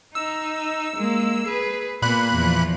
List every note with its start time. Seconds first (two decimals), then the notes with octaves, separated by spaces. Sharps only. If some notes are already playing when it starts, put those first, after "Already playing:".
0.15 D#4 E6
0.96 G#3 A#3
1.46 G#4 B4
2.02 A#2 A#3 B3 B5 F#6
2.32 E2 F3